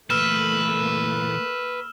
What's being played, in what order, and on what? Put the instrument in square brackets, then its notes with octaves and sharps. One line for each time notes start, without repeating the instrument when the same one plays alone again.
[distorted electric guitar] A#2 E3 [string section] A3 A#3 [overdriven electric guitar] B4 [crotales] E6 F6 E7